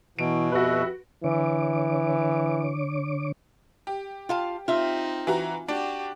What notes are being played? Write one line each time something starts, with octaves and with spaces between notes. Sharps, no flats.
B2 E3 F#3 D7
F2 F#4 G4 B4 E5
D3 E3 C#5 D6
G4
F4 F5 A5
C4 D#4 F4 E5
E3 F#4 A#5
D4 F#4 G4